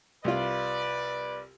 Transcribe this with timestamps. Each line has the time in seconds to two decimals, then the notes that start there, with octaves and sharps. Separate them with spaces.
0.24 C2 F4 B4 D5